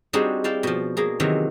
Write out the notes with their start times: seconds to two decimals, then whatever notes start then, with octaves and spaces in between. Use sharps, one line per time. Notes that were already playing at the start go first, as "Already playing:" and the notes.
0.13 G3 C4 D4 D#4 F#4 G#4
0.44 E4 D5 F5 G5 A5
0.63 B2 F3
0.97 B2 A#3 G#4
1.20 C3 D#3 E3 F#3